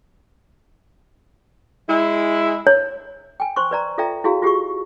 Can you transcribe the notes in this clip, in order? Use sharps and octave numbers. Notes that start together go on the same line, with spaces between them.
G#3 E4
C#5
G5 G#5
C5 C6 C#6
B4 D5 A#5
F4 A4 D5 E5 G5 A#5
E4 F#4 G#4 F5
F4 G4 G#4 C#6